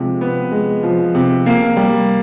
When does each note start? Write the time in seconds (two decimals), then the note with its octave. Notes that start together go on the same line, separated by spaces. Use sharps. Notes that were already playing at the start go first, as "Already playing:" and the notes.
Already playing: C3 F3 G#3
0.21 B3
0.52 G#3
0.83 F3
1.15 C3
1.46 A#3
1.77 G3